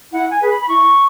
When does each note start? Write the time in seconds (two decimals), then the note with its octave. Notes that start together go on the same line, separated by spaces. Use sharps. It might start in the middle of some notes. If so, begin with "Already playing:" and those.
0.12 E4 F#5
0.31 G#5
0.40 G#4 B4
0.49 B5
0.59 B5
0.68 E4 C#6